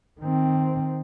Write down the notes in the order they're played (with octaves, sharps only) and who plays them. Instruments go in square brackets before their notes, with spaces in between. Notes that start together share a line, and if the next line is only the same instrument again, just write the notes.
[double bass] D#3 C4